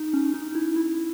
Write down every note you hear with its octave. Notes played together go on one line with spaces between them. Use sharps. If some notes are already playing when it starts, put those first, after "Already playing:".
Already playing: D#4
C#4
D#4
E4
E4